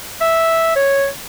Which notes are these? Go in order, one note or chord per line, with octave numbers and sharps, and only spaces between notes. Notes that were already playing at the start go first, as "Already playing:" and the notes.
E5
C#5